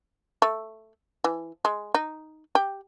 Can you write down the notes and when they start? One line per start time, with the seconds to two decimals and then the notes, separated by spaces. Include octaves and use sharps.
0.42 A3
1.24 E3
1.65 G#3
1.95 D#4
2.55 G4